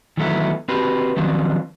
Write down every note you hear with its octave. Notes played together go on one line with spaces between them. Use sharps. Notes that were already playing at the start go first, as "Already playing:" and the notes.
D#3 E3 F#3 A3 B3 E4
C4 F#4 G4 B4
D#3 F3 F#3 C4